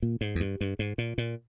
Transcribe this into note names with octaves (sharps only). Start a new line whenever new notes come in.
A#2
G#2
E2
G2
G2
G#2
A#2
A#2